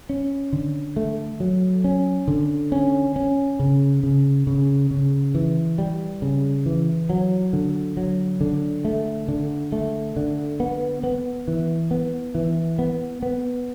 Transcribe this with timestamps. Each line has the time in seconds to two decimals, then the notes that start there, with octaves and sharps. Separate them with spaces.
0.09 C#4
0.53 D3
0.96 A3
1.40 F#3
1.84 C#4
2.28 D3
2.72 C#4
3.16 C#4
3.60 C#3
4.03 C#3
4.47 C#3
4.91 C#3
5.35 E3
5.78 G3
6.22 C#3
6.66 E3
7.10 F#3
7.53 D3
7.97 F#3
8.41 D3
8.85 A3
9.28 D3
9.72 A3
10.17 D3
10.60 B3
11.03 B3
11.48 E3
11.91 B3
12.35 E3
12.79 B3
13.22 B3